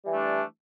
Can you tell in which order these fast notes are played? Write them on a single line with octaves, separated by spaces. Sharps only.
G3 E3 A3 D4